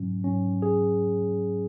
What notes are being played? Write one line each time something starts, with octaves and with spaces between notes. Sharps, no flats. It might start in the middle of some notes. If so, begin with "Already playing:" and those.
Already playing: G#2 F#3 C#4
G#2 F#3 C#4
G#4